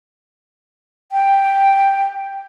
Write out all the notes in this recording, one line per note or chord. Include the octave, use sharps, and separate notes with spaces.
G5